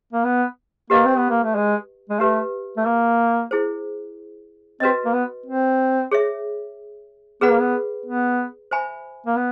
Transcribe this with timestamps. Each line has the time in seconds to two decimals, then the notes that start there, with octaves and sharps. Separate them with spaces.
0.13 A#3
0.24 B3
0.90 A#3 G4 B4 D#5 F#5
1.05 C4
1.17 B3
1.30 A#3
1.43 A3
1.56 G#3
2.10 G#3
2.20 A3 G4 B4 E5
2.77 A3
2.85 A#3
3.51 E4 G#4 C5
4.80 C4 F#4 B4 D#5
5.05 A#3
5.14 B3
5.46 C4
6.12 G#4 C#5 E5
7.41 B3 G#4 B4 D5 F#5 B5
7.51 A#3
7.61 B3
8.06 B3
8.71 C5 E5 G#5 B5
9.26 A#3
9.37 B3